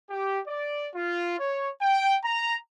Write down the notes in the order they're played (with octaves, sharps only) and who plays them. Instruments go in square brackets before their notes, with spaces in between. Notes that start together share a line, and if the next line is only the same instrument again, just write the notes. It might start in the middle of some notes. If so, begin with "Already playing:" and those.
[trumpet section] G4
D5
F4
C#5
G5
A#5